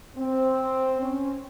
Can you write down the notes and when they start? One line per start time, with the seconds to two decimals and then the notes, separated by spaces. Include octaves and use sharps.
0.16 C4
1.00 C#4